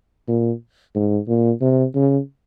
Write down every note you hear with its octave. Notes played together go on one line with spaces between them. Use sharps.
A#2
G#2
A#2
C3
C#3